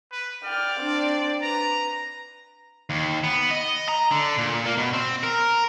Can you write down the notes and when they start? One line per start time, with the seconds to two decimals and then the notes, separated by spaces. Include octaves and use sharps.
0.11 B4
0.44 D5 G5 F6
0.80 C4 D4
1.42 B4 A#5
2.90 D#2
3.24 B3
3.51 D#5
3.89 A#5
4.11 D3
4.38 A#2
4.66 A#3
4.78 B2
4.93 C4
5.23 A#4